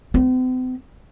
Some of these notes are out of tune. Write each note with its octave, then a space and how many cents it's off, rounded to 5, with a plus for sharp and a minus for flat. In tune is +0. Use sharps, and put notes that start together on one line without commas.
C4 -45